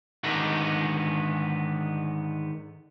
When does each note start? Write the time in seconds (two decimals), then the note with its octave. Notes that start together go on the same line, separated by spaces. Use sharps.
0.23 G#2 D3 D#3 B3 D4 D#4